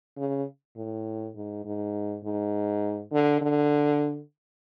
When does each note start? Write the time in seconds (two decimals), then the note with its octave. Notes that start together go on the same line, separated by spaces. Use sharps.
0.17 C#3
0.77 A2
1.35 G#2
1.65 G#2
2.24 G#2
3.12 D3
3.42 D3